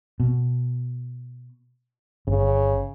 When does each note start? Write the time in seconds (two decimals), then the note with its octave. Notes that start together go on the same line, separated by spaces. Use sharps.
0.20 B2
2.27 G1 C#3